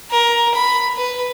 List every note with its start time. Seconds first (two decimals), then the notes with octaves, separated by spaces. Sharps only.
0.11 A#4
0.55 B5
0.97 B4